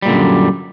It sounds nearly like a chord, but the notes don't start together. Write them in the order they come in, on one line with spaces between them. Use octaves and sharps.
G3 A#2 D3 F#2